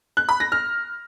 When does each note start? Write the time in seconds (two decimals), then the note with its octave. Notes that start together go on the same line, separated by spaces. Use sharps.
0.17 F#6
0.29 B5
0.40 A#6
0.52 F6